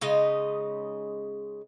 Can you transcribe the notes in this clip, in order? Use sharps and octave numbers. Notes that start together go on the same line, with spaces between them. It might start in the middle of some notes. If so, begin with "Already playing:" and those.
C#3 G#3 D#4 D#5